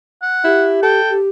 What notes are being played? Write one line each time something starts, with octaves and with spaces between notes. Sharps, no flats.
F#5
E4 G4
A4 G5
G4